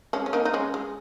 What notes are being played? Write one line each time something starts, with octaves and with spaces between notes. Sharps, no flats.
G#3 C#4
C#4
A#3 D#4
D#4
G#3 C#4
G#3